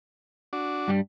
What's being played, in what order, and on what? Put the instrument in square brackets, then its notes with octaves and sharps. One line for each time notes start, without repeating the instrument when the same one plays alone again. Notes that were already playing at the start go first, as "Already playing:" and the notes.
[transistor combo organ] D4 F#4 D6
[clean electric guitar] G2 G3